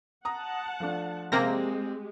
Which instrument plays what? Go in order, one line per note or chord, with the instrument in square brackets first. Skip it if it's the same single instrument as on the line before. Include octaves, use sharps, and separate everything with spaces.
[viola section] F#5 A5 [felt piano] A#5 D#6
[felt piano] F3 A3 D4
[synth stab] C3 A#3 A#6 [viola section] G#3 G4 [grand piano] C4